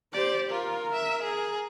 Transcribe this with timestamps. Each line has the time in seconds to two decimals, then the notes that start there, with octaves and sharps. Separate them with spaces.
0.13 G4 C5 D5
0.50 F4 A#4
0.92 E5
1.22 G#4